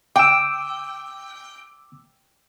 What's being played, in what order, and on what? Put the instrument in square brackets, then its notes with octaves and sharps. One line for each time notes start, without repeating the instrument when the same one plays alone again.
[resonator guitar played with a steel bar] G5 [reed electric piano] D6 E6